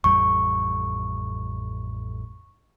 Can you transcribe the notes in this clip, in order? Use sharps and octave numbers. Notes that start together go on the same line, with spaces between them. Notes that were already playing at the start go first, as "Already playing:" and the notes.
A1 F2 G3 C#6